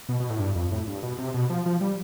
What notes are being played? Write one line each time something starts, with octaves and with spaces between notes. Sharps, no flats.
B2
B2
A2
G2
F2
A2
G2
B2
C3
B2
F3
F3
G3